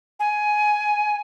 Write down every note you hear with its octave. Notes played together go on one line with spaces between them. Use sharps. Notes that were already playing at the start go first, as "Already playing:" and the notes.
G#5